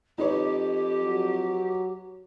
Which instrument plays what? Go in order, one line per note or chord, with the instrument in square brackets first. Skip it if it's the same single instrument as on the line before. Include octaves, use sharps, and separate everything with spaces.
[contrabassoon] F2 [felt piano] D#4 B4 C#5 [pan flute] G4
[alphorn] F#3